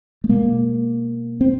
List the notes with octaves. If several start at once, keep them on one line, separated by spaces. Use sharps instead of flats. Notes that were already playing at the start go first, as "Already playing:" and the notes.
A3
B2 G#3 A#3
C4